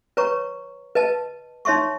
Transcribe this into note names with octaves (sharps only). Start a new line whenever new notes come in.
B4 C#5 A#5 C#6
B4 D#5 A5
D#4 C#5 E5 C6 C#6